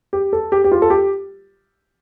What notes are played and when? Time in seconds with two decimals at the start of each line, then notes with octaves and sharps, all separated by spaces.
0.13 G4
0.33 A4
0.52 G4
0.64 G4
0.72 F4
0.82 A4
0.90 G4